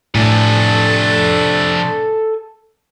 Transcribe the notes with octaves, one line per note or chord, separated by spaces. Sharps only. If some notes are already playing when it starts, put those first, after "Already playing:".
A2 C3 F3 A3 D4 A4 G#5